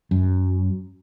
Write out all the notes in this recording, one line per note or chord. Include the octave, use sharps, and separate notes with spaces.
F#2